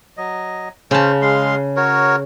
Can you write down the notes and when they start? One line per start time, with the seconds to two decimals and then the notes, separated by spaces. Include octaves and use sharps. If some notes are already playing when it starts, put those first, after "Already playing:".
0.17 F#3 D#5
0.91 C#3 C#4 C5 A5
1.22 G#3 F5 C6
1.77 F#4 A#4 C#5